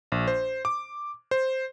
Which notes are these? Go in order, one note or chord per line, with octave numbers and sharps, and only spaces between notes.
A#1
C5
D6
C5